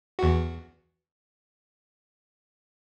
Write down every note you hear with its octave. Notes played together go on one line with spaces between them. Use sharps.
E2 F#4